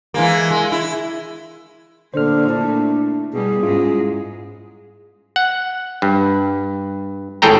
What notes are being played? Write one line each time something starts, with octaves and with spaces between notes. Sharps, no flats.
E3 G#3 A#3
G#3
E4
A#2 D3 A3 C5 F6
D4 E4 A5
B2 G3 G#4
G#2 G#3 C#4 E4 F4
F#5
G2
G#1 A2 G#4 A4 G5 A#5